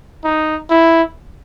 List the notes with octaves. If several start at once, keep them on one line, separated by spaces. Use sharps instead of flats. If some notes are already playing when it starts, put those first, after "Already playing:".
D#4
E4